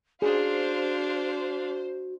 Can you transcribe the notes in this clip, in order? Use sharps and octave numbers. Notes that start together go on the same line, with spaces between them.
D4 F#4 G#4 C5 F5